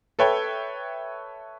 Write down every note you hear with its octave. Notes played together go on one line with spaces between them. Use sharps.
A4 B4 C#5 E5 G5